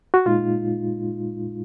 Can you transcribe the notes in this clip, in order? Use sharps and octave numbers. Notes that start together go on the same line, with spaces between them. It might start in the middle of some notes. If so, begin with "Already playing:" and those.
F#4
A#2 G#3 D#4 F4